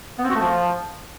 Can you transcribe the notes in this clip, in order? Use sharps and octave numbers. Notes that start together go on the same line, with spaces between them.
B3
C4
F#4
A3
F3